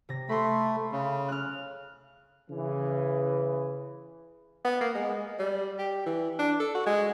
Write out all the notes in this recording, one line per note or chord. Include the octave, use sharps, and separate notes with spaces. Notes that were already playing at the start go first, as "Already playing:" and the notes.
C3 A#6
A3 B5 C6
C#3
F6 F#6
C#3 E3
B3
A#3
G#3
G3
G4
E3
D4
A4
F#4
G#3